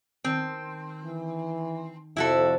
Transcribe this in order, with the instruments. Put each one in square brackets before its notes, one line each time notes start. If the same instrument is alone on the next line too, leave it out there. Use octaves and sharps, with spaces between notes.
[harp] D#3 A5 [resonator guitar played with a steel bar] C4
[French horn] E3
[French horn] F2 [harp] C3 F3 G4 [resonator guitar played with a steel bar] E4 F#4 A4